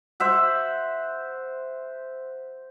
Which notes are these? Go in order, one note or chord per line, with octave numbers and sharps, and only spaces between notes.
C5 E5 F#5